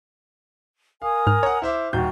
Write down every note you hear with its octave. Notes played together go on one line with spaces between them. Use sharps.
A#4 F5 G#5 D#6
G#2 F6
C#5 F#5 A#5
E4 C5 E5 D6
D#1 F#4 G5 A#5 G6